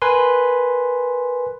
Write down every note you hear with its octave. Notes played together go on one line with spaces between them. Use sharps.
A#4 B4 G#5 C6